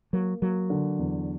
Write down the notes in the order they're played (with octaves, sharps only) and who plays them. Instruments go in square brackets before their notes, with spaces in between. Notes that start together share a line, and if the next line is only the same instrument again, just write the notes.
[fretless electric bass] F#3 [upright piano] A#3
[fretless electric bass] F#3 [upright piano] A#3
[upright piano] D3
E2